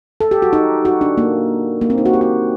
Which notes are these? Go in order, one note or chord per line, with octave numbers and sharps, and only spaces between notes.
A4
G4
F#4
D#4
F#4
D4
A#3
A#3
C4
D#4
F#4
G4
F#4